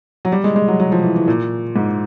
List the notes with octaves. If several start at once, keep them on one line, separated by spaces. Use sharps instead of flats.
F#3
G3
G#3
G#3
F#3
F#3
F3
E3
E3
A#2
G#2